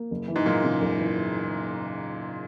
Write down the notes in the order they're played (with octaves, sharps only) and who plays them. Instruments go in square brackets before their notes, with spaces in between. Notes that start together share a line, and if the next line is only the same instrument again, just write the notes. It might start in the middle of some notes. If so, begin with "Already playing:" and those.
Already playing: [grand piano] A#3
F#1
E3
[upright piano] G#2
[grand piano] F#2 [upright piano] A#2
[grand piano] C#3
F#1
E3